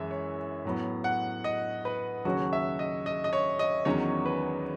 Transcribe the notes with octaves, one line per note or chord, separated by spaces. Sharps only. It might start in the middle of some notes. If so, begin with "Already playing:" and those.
Already playing: F#2 E3 G#3 C#4 E5
C#5
A2 F#3 B3
F#5
D#5
B4
D#2 C#3 F#3 C#4 F#4
E5
D#5
D#5
D#5
C#5
D#5
E2 D#3 F#3 C#4 C#5
B4